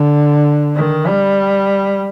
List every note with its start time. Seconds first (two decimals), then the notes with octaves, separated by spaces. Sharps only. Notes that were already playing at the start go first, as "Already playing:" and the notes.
Already playing: D3
0.75 D#3
1.07 G3